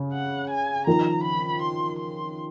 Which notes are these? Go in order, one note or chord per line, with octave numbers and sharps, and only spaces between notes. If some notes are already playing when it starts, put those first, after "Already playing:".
Already playing: C#3
F#5
G#5
D#3 F3 A#5
B5
C6
C6